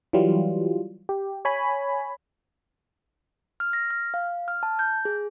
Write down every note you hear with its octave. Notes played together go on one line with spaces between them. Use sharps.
E3 F#3 G3 F4
G4
C#5 G#5 B5
F6
A#6
F6
F5
F6
A5
G6
G#4